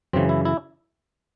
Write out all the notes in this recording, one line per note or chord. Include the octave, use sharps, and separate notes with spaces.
F#2 C#3 E3 C4
E4
E4